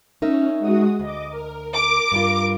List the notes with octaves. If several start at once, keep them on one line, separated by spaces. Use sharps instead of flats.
C#4 D#4 A#4 E5
G#3 F#4 D#6
D2 D#5 D6
A#4
A#4 D6
G2 G3 F4